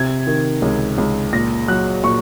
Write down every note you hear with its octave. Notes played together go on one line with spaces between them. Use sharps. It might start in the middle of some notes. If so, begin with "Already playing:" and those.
Already playing: C3 G#6
D#3
C#2
C#2
A#2 A#6
F#3 F#6
A#2 C#6